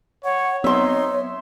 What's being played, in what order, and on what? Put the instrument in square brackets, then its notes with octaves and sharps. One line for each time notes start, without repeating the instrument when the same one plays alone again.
[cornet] C#5 [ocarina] F#5
[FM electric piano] F#3 B3 C4 [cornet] D#4 [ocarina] C#5 [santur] E5 C6